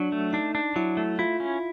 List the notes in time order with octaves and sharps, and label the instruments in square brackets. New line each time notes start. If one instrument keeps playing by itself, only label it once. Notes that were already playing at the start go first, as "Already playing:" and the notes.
Already playing: [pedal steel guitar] F#3 [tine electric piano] D4
[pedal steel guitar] A3
[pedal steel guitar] D4 [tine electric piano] D#4
[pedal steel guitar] D4
[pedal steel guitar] F#3 [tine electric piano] E4
[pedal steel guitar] A3
[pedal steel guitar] E4 [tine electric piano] F4
[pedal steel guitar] C#4